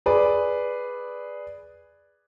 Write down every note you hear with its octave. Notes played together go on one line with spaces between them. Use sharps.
G#4 B4 D5